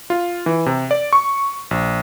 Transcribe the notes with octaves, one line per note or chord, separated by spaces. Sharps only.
F4
E3
C3
D5
C#6
A#1